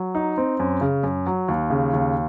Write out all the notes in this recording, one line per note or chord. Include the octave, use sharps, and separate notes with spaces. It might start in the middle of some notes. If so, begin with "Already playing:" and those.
Already playing: F#3
D#4
C4
F#2
C#3
F#2
F#3
D#2
C#3
D#2